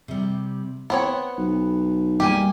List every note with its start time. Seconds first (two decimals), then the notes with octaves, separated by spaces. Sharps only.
0.08 C3 G3
0.90 B3 C4 C#5 F#5
1.38 B1
2.20 G3 A#3 G4 G#5